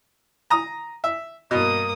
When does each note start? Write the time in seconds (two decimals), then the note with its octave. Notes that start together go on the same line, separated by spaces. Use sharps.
0.50 A#5 D#6
1.04 E5
1.51 G2 B2 A#3 D#6